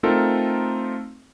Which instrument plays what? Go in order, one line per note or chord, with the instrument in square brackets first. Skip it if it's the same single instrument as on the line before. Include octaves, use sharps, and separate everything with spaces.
[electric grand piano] A3 C4 D#4 F4 A4 A#4